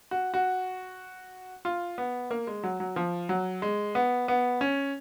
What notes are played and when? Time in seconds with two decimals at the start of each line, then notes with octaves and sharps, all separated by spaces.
0.11 F#4
0.34 F#4
1.65 F4
1.98 B3
2.31 A#3
2.47 G#3
2.63 F#3
2.80 F#3
2.96 F3
3.29 F#3
3.62 G#3
3.95 B3
4.28 B3
4.61 C#4